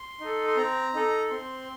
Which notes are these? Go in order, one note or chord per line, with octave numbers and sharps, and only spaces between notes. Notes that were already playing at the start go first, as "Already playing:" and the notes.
Already playing: C6
D#4 A4
C6
C4 A#5
D#4 A4
C4 C6